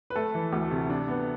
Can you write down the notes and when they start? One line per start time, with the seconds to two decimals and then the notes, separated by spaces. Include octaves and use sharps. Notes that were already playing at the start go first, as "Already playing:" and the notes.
0.10 B4
0.16 A3 A4
0.35 E3
0.53 D2
0.71 C3
0.90 D4
1.08 B3